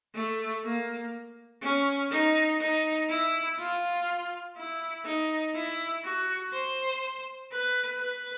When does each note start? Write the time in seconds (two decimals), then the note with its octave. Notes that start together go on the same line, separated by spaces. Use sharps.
0.15 A3
0.64 A#3
1.62 C#4
2.11 D#4
2.60 D#4
3.09 E4
3.59 F4
4.57 E4
5.05 D#4
5.55 E4
6.04 F#4
6.53 C5
7.52 B4
8.00 B4